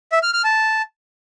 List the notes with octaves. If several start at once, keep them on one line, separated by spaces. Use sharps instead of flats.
E5
F6
F6
A5